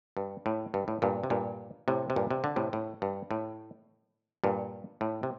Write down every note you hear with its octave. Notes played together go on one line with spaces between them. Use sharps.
G2
A2
G2
A2
G2 A#2
C3
G2 A#2
A2 C3
C3
G2 A#2
C3
D3
A2 C3
A2
G2
A2
G2 A#2
A2
C3